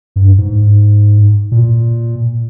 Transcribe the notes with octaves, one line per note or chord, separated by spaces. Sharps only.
G2
G#2
A#2